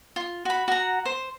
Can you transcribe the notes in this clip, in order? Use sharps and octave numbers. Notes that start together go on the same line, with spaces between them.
F4
F#4 B5
F#4 F#5 A#5
C5